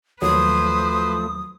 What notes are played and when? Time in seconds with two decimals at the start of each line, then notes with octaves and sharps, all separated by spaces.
0.22 D#2 D#3 F3 F#3 A3 B4 C5 D#6